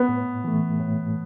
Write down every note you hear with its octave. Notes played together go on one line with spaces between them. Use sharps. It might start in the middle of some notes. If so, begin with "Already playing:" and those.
Already playing: B3
A2
E3 A3
A2